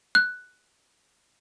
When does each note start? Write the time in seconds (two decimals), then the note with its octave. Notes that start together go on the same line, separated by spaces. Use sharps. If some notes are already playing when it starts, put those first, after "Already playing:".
0.15 F#6